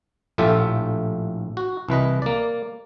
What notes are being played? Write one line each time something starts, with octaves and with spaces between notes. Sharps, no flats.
A#1 A2 A3 F4 G4 E5
F#4
C2 E3 B4 D#5
A#3 D5